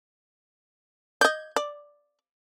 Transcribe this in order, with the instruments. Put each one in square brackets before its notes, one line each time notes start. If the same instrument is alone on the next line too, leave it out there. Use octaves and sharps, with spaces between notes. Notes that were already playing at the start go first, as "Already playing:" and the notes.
[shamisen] D5 D#5 [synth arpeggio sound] G6 G#6
[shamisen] D5